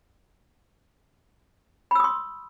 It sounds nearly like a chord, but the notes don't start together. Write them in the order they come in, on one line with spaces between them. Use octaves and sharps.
B5 E6 D#6 C6